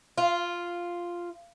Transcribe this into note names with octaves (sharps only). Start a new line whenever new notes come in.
F4